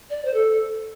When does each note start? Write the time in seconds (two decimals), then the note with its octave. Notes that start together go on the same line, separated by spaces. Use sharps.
0.10 D5
0.25 C5
0.34 A4